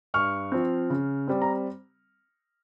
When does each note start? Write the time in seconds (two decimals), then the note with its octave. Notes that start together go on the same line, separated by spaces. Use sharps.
0.14 G2 C#6 F6
0.52 F3 C4
0.90 C#3
1.28 G3 C4
1.42 A#5